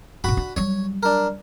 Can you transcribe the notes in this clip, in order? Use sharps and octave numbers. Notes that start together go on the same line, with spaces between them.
G2 A#2 F#4 B5
D4
F#3 G3 C#5
D4 A#4